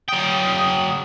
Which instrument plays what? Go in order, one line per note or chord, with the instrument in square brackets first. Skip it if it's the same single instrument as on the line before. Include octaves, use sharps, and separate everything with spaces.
[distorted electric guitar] F#3 G5 [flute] D#6